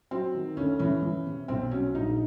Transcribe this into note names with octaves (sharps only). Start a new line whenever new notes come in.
F#3 C4
D#3
D2 C#4
E3 C#4
E3
C3
B1 C4
F#3 C#4
A#1 D#4